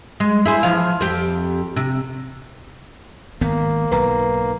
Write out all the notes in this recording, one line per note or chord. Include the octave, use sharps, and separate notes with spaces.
G#3
E4 G#4 C5
E3 F3 F5
F2 G4
C3
G#1 D#3 A#3 B3
B1 G#2 B4 A#5